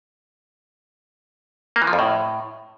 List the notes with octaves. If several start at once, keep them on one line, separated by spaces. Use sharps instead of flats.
A#3
E3
F3
F2
A2